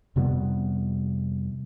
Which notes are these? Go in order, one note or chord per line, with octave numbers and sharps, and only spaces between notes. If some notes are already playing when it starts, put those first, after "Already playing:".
F2 C3 G3 B3